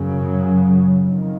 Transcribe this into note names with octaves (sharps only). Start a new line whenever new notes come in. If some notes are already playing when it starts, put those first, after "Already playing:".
Already playing: F#2 C#3 F#3
F2 D#3